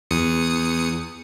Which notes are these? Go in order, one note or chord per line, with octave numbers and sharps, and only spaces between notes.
E2 D#6 C#7